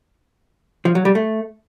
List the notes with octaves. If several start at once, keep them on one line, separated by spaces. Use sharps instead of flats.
F3
F#3
G3
A3